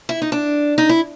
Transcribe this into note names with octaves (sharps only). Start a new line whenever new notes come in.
E4
D#4
D4
D#4
E4